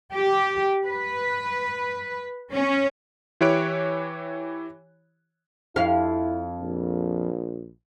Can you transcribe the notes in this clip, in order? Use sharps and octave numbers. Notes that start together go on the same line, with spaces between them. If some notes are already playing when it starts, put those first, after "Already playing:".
G4
B4
C#4
E3 E4 G4 C#5 F#6 D7
F2 E4 F5
A#1